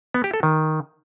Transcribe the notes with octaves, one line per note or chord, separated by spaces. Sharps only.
B3
G4
A4
D#3